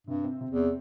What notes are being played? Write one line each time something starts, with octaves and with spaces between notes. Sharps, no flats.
G2 C3
C4
C3
E2 C4